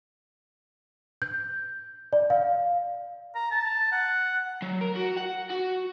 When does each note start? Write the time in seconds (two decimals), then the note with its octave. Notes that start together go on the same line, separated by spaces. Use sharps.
1.22 G6
2.13 D5
2.30 F5
3.35 A#5
3.51 A5
3.92 F#5
4.62 F#3
4.81 A#4
4.96 F#4
5.17 F#5
5.50 F#4